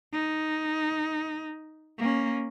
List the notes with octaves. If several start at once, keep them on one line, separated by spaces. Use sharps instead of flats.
D#4
A#3 C#4